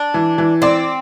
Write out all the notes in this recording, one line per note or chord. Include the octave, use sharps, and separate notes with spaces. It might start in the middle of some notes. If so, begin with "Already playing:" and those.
Already playing: D4
E3
E3
C4 D5